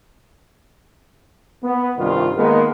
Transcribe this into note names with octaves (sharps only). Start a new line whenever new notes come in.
B3
C2 G2 D#3 F4
D#3 G#3 A#3 B3